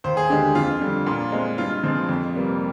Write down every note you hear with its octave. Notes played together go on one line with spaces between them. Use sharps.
D#2 C5
G#4
D3 G#3 G4
F2 F4
D3 G3
A#2
G#3 C4
G2 F4
F3 G#3 C4
F2
C3 G3 A#3